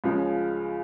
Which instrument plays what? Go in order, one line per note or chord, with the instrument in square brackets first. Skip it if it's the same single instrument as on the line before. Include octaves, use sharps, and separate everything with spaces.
[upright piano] C#2 C#3 F3 G#3